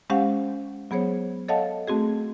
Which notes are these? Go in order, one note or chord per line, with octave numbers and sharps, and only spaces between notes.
G#3 C#4 G4 C5 F5 F#5
F#3 B3 G#4 C5 C#5
A4 C#5 D#5 F5 F#5 A5
A3 C4 F#4 G#4